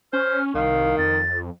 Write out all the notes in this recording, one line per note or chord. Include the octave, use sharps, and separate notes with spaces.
C#4 C5 F6
C2 D#3 F5
F2 A6